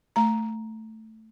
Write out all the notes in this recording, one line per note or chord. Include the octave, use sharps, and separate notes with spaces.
A3 A#5